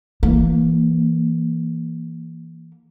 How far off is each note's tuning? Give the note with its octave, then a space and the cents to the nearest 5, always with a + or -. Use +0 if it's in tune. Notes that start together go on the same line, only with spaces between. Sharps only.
E3 +0 A#3 +0